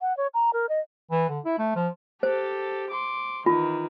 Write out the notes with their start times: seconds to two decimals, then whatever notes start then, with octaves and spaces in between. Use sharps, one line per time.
0.01 F#5
0.17 C#5
0.34 A#5
0.53 A#4
0.69 D#5
1.11 E3
1.29 D3
1.45 E4
1.59 A3
1.75 F3
2.23 G4 A4 C5
2.91 C6 D6
3.46 D#3 E3 F4